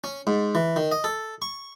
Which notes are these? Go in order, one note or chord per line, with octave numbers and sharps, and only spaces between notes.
C#4
G#2
E3
D#3
D#5
A4
C#6